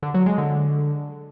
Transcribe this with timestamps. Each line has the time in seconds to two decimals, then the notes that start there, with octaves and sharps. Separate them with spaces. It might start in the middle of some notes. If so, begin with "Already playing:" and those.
0.03 D3
0.14 F#3
0.26 G#3
0.38 D3